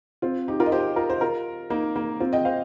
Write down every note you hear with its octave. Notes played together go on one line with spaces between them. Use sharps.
C4 F4
D#4 G4
F4 A#4
D#5
G4 C5
F4 A#4
C5
F4 A#4
A#3 D#4
A#3
C4 F4
D#5 G5
C5 F5